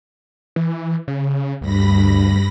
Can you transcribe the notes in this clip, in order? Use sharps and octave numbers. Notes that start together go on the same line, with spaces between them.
E3
C#3
D2 G2 B5 A#6